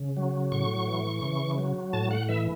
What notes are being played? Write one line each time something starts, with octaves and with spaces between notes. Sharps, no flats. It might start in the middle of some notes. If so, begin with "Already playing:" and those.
Already playing: C#3
F#3
A2 C#6
E3
C#3
F#3
A2 A5
F#5
E3 E5